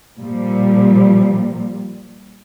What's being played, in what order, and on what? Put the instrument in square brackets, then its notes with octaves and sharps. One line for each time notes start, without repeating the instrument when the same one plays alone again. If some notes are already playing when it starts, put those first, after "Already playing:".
[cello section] A#2 F3 G3